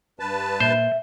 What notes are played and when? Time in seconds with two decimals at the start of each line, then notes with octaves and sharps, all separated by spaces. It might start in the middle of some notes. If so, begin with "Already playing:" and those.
0.20 G2 B4 A5
0.60 A#2 C5 E5